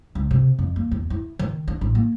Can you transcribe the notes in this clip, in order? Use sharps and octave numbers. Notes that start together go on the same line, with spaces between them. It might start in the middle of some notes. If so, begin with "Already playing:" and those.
C#2
C3
F2
A#3
E2
E4
D#3
D4
A1
A#3